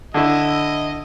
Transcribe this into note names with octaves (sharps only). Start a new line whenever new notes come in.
D3 E4 D#5